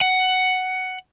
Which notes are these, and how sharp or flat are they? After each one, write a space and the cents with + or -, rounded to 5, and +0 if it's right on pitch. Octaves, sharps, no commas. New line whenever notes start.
F#5 +10